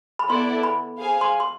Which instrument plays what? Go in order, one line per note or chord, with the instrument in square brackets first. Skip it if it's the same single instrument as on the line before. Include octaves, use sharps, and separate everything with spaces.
[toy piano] B5
[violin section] B3 E4 A4 D5 [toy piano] C6
[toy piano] B5
[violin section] G#4 C5 F5 G#5
[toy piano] C6
C6